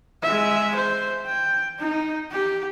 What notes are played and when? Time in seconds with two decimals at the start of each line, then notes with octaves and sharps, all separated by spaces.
0.23 G#3 E5
0.76 C5
1.26 G5
1.79 D#4
2.31 G4